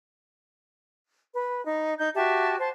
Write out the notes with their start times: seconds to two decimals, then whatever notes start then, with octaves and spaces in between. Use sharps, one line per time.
1.34 B4
1.65 D#4
1.98 D#4 G6
2.15 F#4 G4 E5 A5
2.59 C5 A5